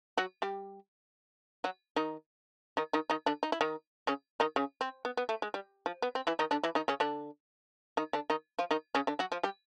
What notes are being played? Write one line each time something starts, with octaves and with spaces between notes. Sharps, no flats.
F#3 F#4
G3 G4
F#3 F#4
D#3 D#4
D#3 D#4
D#3 D#4
D#3 D#4
D3 D4
D#4
E4
D#3 D#4
C#3 C#4
D#3 D#4
C#3 C#4
C4
B3
B3
A3
G#3
G3
F3
B3
C4
E3 E4
D#3 D#4
D3 D4
E3 E4
D#3 D#4
C#3 C#4
D3 D4
D#3 D#4
D3 D4
D#3 D#4
F3 F4
D#3 D#4
C#3 C#4
D3 D4
F#3 F#4
F3 F4
G3 G4